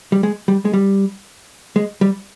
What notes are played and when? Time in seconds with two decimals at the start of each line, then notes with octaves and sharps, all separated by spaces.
0.12 G3
0.23 G#3
0.48 G3
0.65 G#3
0.73 G3
1.76 G#3
2.01 G3